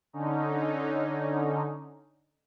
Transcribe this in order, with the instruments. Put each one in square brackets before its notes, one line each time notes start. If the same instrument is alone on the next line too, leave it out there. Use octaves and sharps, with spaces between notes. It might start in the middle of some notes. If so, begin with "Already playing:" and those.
[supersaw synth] D3 C#4 D#4